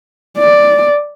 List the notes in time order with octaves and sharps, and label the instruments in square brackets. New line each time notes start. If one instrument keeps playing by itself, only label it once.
[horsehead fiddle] D5